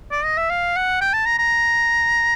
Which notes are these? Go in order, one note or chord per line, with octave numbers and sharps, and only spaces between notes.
D5
D#5
E5
F5
F#5
G5
A5
A#5
A#5